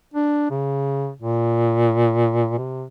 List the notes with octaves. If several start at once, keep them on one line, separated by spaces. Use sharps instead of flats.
D4
C#3
A#2
C3